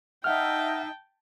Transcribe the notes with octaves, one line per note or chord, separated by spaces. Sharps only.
D#4 E5 F#5 G5 A5 F6